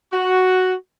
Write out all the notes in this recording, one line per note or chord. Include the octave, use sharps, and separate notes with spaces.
F#4